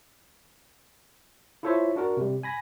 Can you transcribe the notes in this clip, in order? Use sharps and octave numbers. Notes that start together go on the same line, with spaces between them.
E4 F4 A4 C5 C#5 E5
D4 F#4 A#4
C3 G3
G#5 B5 A#6